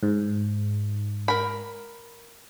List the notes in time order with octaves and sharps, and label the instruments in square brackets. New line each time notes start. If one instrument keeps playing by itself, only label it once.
[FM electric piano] G#2
[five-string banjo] A#4 B5